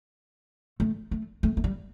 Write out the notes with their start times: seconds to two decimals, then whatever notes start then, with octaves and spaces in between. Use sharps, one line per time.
0.80 A3
1.11 A3
1.43 A3
1.57 A3
1.64 G3